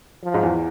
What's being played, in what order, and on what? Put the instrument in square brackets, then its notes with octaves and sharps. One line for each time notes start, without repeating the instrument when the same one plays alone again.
[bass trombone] F3
[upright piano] G#2 G#3
E2 E3